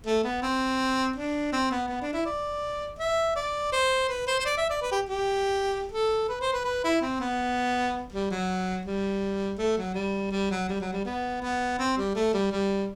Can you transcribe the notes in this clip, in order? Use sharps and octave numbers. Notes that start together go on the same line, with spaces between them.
A3
B3
C4
D4
C4
B3
B3
D4
E4
D5
E5
D5
C5
B4
C5
C5
D5
E5
D5
B4
G4
G4
A4
B4
C5
B4
B4
E4
C4
B3
G3
F#3
G3
A3
F#3
G3
G3
F#3
G3
F#3
G3
B3
B3
C4
G3
A3
G3
G3